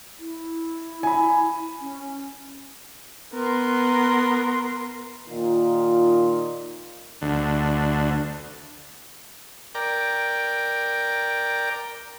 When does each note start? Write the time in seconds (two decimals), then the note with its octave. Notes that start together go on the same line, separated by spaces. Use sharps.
0.19 E4
1.03 G#5 B5
1.81 C#4
3.34 B3 A#4 C6
5.28 A#2 D#3 D#4 F4
7.21 D2
9.75 A#4 D5 G5